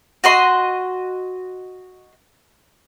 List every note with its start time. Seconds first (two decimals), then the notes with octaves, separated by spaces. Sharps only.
0.24 F#4 D#5 C6